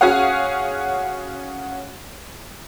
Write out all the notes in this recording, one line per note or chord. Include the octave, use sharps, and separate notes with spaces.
C#4 F#4 G#4 C#5 F5 F#5